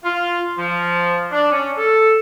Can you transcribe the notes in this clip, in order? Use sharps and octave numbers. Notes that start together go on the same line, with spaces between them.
F4
F3
D4
C#4
A4